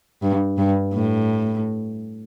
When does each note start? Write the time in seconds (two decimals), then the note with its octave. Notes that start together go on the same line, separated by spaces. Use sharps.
0.22 G2
0.58 G2
0.93 A2